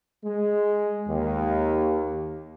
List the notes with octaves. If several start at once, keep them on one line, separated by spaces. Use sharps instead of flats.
G#3
D#2